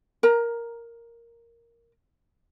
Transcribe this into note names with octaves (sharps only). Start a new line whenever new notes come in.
A#4 A#5